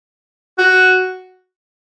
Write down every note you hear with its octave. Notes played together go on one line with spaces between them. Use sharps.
F#4